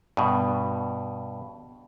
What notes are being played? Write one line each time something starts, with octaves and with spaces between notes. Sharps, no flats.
G2 B2